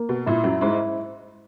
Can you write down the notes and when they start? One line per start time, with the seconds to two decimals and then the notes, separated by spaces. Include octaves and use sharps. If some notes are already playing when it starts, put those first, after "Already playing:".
Already playing: A#3
0.09 B2
0.26 A#2 E4
0.44 F#2 F#3
0.61 G#2 G#3 E4